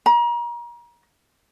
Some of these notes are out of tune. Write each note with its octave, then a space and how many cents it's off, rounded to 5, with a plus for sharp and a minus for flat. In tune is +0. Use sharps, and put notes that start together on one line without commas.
A#5 +35